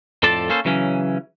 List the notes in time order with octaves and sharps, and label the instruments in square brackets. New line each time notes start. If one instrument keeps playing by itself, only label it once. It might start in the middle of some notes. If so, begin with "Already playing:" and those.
[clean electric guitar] F2 A2 A4 C5 D5 A5
A#3 C#4 A4 C5
C#3 E3 F#3 C#4